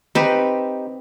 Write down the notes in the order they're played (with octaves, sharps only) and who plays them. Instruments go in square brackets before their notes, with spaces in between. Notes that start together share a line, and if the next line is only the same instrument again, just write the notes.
[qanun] C4 B4 [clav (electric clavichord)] D#4 G4